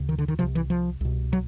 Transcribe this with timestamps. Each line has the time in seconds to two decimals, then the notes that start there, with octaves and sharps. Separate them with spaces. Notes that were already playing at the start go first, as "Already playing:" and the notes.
Already playing: D2 C#3
0.09 D#3
0.18 D3
0.28 D#3
0.39 C2 C3 F3
0.55 E3
0.70 F3
1.01 C2 B2
1.33 F#3